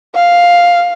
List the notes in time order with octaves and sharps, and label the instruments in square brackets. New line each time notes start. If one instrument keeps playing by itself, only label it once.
[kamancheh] F5